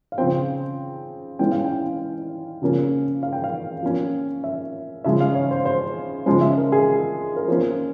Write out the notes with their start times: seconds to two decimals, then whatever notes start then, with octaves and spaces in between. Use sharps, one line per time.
0.12 F5
0.18 C#3 F3 C4 G5
1.39 E3 G#3 C#4 G5
1.51 F5
1.64 G5
2.62 C#3 F3 A#3 C#4
3.23 F5
3.33 G5
3.44 F5
3.82 F3 A#3 C#4
4.44 E5
5.04 C#3 F3 G#3 E5
5.20 F5
5.35 C#5
5.51 C5
5.65 C5
6.26 C#3 F3 G#3 C#4 C5
6.41 E5
6.57 A#4
6.72 G#4
7.36 A#4
7.48 F3 A#3 C#4 C5